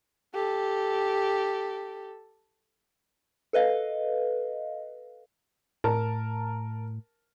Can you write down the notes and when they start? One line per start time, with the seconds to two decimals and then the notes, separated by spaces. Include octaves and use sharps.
0.34 G4 A4
3.53 A4 B4 D#5 F5
5.84 A2 A#4 A5